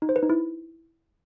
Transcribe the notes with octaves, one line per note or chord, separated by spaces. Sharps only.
D#4
C5
B4
D#4
E4